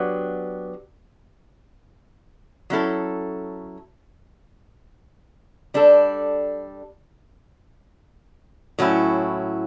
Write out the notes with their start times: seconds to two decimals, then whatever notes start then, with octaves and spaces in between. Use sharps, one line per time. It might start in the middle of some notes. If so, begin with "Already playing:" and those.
Already playing: F#3 B3 D4 G4
2.70 F#3 C#4 E4 A4
5.74 G3 D4 A4
8.79 A2 F#3 C#4 E4